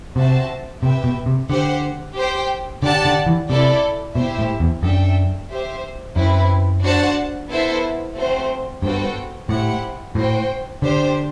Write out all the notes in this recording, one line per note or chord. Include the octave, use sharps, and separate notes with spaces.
C3 C4 F#4 C5 E5 A5
C3 G4 B4 E5 G5
B2
C3
D3 G4 C5 F#5
G4 C5 G5
D3 G4 D5 F#5 A5
D3
E3
C3 E4 A4 D5
B2 E4 G4 C5 E5
A2
E2
F#2 D4 A4 E5 G5
G4 C5 E5
F#2 C4 E4 B4
D4 F#4 C5 F#5 A5
B3 E4 A4 C5 E5
A3 C4 F#4 C5
G2 B3 F#4 A4 C5 G5
A2 E4 G4 C5 F#5
A2 F#4 C5 G5
D3 D4 G4 C5 G5